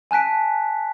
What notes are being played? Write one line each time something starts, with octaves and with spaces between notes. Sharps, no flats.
G#5 A5 F#6 B6 D7